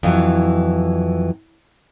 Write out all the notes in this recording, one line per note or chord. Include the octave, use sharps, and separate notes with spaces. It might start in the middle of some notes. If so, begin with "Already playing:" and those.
F2 E3 F#3